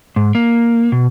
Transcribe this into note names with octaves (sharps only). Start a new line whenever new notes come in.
G#2
A#3
B2